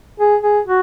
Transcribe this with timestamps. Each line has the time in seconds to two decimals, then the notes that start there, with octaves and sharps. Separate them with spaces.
0.20 G#4
0.43 G#4
0.67 F#4